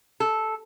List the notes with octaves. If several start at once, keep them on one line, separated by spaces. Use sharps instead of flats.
A4